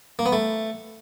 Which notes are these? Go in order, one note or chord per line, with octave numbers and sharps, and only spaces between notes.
A#3
B3
A3